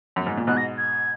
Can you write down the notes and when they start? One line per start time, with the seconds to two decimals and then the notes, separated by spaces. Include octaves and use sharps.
0.16 F#2
0.27 G#2
0.37 A#2
0.47 G#2 B2 F#6
0.57 A#6
0.78 G#6